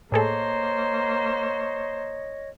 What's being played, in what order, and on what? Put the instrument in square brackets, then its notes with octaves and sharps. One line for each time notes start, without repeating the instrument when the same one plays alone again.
[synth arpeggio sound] A2 G#4 A4 [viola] A#3 C5 [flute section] C#5 D#5